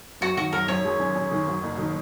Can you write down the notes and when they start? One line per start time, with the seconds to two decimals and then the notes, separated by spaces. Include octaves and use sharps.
0.21 F#2 F#4
0.37 D#3 F#4
0.53 F#2 A#4
0.68 F#2 C#5
0.85 G#3
1.00 C#4
1.15 C#4
1.31 D#3
1.47 F#2
1.63 F#1
1.78 D#3